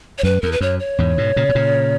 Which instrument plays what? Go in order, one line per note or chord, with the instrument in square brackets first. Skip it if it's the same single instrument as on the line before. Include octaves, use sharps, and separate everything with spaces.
[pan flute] C#5
[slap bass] F#2 [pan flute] B4
[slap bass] E2 [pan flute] A#4
[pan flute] B4
[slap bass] F#2 [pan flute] C#5
[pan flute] C#5
[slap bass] E2 G#2
G#2 B2
A#2 C#3
B2
A#2 C#3